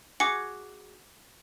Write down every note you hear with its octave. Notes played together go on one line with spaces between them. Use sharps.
F#4 G#4 D6 C#7